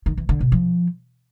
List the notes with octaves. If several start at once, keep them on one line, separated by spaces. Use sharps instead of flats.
D#3
E3
D3
B2
F3